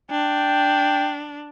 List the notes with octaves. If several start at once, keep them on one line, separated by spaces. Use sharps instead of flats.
D4 G5